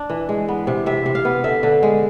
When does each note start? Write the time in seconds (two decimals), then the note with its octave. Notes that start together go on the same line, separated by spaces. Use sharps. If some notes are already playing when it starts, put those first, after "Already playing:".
Already playing: D4
0.10 E3
0.29 G#3
0.48 B3
0.67 C3
0.86 C3 E5
1.06 C3
1.15 F5
1.25 B3
1.44 D3 E5
1.63 D3
1.83 G#3